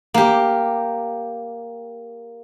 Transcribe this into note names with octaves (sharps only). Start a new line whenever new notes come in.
A#3 G4